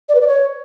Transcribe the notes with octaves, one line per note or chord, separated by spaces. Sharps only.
D5
B4
D5
C#5